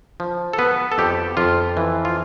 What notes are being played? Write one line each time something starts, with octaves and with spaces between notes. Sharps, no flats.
F3
A4
B3 B4
A4
F2 G4
F2 F4
E3
F4